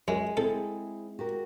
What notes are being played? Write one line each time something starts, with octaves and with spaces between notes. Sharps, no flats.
F#2 G#3
C4 E4 G#4 A4
F#4 G4 A#4